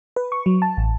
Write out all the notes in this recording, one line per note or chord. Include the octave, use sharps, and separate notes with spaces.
B4
C#6
F#3
A5
A1